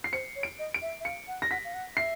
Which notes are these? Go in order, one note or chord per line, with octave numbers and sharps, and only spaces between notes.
C7
C5 C#7
C#5
D7
D#5
D7
E5
E5
F5 C#7
F#5
A#6
F#5 B6
F5
F#5
E5 C7